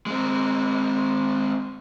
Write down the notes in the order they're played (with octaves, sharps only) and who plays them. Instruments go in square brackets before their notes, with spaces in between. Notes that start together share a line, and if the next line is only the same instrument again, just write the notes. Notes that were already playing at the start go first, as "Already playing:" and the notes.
[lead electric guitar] G#3 C4